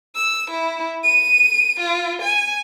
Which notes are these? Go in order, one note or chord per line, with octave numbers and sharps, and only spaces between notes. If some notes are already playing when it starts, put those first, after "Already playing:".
E6
E4
D#7
F4
G#5